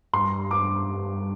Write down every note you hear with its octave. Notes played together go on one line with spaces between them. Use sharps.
G2 C6
D6